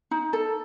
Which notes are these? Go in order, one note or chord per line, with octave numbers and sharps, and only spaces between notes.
D#4
A4